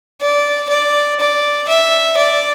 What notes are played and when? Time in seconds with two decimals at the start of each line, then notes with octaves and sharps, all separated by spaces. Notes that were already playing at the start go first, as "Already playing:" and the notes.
0.21 D5
0.69 D5
1.20 D5
1.68 E5
2.17 D5